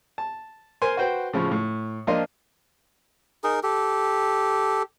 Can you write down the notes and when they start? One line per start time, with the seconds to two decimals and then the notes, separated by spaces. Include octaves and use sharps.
0.18 A5
0.82 A#4 C5 G#5 C6
0.97 F#4 B4 C5 G5
1.33 A2 C#3 F3
1.51 A2
2.07 F3 A#3 D4 F4 D#5 C6
3.44 D#4 G#4 A#4
3.63 G4 A4